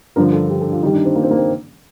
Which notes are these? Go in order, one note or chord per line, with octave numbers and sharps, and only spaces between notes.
G2 D3 F3 A#4
A4
G4
A4
F4
G2 D#3 G3 D#4
D4
C4
A#3
C4
A#3
C4